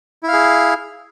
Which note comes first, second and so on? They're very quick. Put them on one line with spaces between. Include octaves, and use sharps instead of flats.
E4 F5 G#4